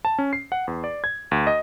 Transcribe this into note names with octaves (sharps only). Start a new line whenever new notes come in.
A5
C#4
C7
F#5
E2
D5
G#6
D2
D#5